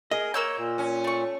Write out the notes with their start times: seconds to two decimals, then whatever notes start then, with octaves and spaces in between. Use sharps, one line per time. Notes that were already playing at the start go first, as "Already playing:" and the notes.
0.11 G#4 A#4 D#5 D#6
0.34 A#3 C#5 E6 G6
0.58 A#2
0.78 C#4
1.04 A3 C#6